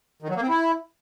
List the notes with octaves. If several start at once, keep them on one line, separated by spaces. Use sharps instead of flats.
D#3
F#3
A#3
C4
E4